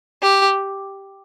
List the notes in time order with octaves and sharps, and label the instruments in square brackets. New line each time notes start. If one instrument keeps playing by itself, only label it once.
[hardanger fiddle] G4